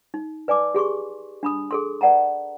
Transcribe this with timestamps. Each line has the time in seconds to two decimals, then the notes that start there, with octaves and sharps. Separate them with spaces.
0.14 D#4
0.48 B4 D5 G#5 A5 D6
0.75 G4 G#4 C6 C#6
1.43 D4 B5 D#6
1.71 G#4 A4 C6
2.01 B4 D5 F#5 A5 A#5